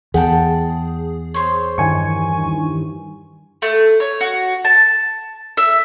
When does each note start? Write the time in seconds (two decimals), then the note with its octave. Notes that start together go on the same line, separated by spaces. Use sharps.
0.14 E2 G#4 F#5 G5 A5
1.34 C5 C#5
1.78 G2 D#3 E3 G#5 C#6
3.62 A3
4.00 C#5
4.21 F#4
4.65 A5
5.57 E5